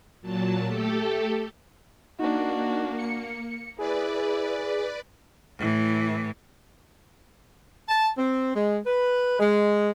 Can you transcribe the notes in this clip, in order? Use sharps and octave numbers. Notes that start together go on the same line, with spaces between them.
A#2 F#3 A5
A3 G4 A4
A#3 D4 D#4 F#4
C#7
E4 G#4 B4 D5
A2 E3
A5
C4
G#3
B4
G#3